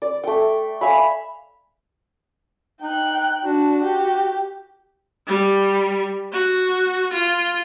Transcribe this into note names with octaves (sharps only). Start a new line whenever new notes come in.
D5
A3 G5
E5 F5 G#5 B5
D#4 G5 F#6
D4 F#4
G4
G3
F#4
F4